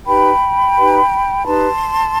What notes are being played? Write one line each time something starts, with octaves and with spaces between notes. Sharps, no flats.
D#4 G4 B4 G5 B5
D#4 G4 B4
D#4 G4 B4 A5 C6